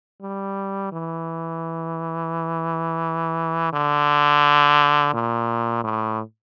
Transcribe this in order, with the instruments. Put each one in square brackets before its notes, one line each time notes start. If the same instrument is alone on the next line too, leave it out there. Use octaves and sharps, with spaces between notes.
[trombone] G3
E3
D3
A#2
A2